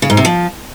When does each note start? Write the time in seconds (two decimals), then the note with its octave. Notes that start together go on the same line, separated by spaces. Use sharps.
0.02 C#3
0.10 G#2
0.17 C3
0.25 F3